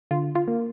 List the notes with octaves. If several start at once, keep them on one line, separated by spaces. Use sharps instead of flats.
D3 F4
F4
A#3